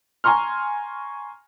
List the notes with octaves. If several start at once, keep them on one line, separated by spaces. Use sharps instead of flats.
G#5 A#5 C6 C#6 F6